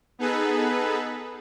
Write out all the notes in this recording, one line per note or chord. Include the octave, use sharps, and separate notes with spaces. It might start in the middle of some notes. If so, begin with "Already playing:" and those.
B3 D#4 G#4 A4 B4